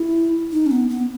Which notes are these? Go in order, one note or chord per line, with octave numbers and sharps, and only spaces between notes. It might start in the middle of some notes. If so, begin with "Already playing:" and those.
Already playing: E4
D#4
C#4
B3
B3